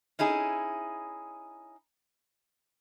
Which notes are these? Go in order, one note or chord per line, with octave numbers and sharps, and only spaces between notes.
C#4 D#4 E4 G#4